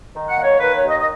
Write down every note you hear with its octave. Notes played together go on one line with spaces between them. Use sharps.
D#3
F#5
A#3
C#5
D#3 B4
C#5
D#2
D#5
D#5